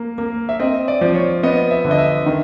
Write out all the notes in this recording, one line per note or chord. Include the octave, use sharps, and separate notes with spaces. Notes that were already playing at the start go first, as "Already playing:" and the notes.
Already playing: A#3
A#3
E5
C4 D#5
D5
F3
C#5
B3 D#5
E5
D3
D#5
E5
D#3